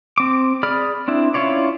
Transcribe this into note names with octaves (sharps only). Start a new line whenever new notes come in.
C4 D6
G#4 D5 B5 F6
C4 D4 E4
C#4 E4 F4 C#5 D5